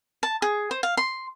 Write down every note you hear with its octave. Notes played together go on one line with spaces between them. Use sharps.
A5
G#4
C5
F5
C6